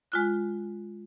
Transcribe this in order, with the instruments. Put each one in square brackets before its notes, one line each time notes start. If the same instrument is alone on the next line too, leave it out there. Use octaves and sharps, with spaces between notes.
[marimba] G#3 F4 F#6